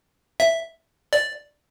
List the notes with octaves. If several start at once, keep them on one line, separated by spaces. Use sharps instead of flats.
E5
D5